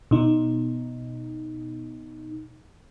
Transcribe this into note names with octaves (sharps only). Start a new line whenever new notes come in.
B2 D#4